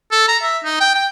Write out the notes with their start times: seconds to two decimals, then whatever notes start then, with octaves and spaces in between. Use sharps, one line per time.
0.12 A4
0.28 A#5
0.42 E5
0.64 D#4
0.80 G5
0.95 G5